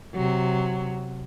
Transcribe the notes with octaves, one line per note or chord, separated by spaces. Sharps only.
C3 F#3